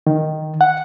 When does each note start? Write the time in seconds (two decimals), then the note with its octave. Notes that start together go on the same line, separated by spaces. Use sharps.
0.07 D#3
0.61 F#5